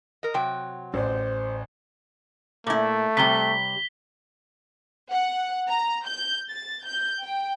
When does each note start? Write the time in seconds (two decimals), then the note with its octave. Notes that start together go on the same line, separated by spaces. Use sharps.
0.23 A#4 D#5
0.34 C3 F#3 G5
0.94 A1 C5 D5
2.67 A#2 A3 E4
3.17 C3 G3 B6 G7
5.11 F#5
5.68 A#5
6.07 G6
6.50 A6
6.84 G6
7.23 G5